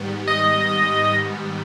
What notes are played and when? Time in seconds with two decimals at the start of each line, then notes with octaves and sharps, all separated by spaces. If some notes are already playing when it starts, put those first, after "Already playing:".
Already playing: G#2 D#3 G3 B3
0.27 D#5